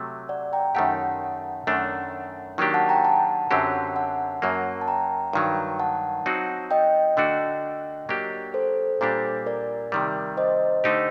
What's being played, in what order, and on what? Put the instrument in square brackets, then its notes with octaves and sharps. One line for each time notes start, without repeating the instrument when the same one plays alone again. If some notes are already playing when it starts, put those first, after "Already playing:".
Already playing: [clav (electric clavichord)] C3 F#3 A3
[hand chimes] D5 F#5
G5 A#5
[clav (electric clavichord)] F#2 D#3 A3 D#4 G4 [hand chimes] F#5 A5
[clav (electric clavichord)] F#2 D#3 A3 D4
D#3 F#3 A#3 D4 G4
[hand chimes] F#5 A5
G5 A#5
F#5 A5
[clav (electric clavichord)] F#2 D3 F#3 C4 G4
[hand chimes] F#5 A5
[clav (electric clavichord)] F#2 F#3 A#3
[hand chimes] A5
G5 A#5
[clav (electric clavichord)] G2 D#3 F#3
[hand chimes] F#5 A5
[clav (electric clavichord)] F#3 C4 D#4 F#4
[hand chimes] D#5 G5
[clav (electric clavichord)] D3 A3 D4 F#4
F#3 A#3 D4 G4
[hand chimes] A4 C5
[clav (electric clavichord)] A#2 G3 D4 G4
[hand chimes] A#4 D5
[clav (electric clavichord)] C3 D#3 G3
[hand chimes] C5 D#5
[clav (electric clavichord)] D3 A3 D#4 G4